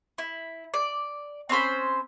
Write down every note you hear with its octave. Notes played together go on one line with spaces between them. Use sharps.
E4
D5
C4 C#4 C5 B5